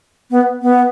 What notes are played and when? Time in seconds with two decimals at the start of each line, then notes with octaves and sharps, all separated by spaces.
0.31 B3
0.62 B3